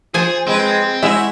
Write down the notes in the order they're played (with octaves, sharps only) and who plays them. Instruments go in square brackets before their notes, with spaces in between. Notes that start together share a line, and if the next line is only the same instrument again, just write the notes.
[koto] F3 C5 G#5 [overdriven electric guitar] G#4
[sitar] G#3 B4 [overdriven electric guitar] C4
[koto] G#3 [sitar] E4 F#4 E5